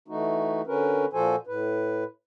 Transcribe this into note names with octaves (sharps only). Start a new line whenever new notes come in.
E3 A3 D#4 F#4
D3 C#4 F#4 A#4 B4
A#2 F3 F#4 A4 C5 G#5
A2 B4